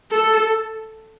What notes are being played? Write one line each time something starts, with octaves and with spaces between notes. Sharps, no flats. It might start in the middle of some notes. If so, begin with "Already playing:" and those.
A4